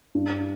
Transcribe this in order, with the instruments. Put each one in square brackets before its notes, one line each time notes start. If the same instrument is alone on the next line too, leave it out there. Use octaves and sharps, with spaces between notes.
[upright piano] G2